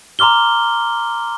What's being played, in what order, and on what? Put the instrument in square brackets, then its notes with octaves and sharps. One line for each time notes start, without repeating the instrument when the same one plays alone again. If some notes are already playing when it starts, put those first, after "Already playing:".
[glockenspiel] A#5 C6 D6 F6 G7